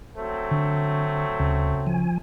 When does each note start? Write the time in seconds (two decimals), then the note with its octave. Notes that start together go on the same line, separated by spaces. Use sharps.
0.17 F#3 A3 C4
0.51 D3
1.40 D2 C#3
1.87 F3 G#5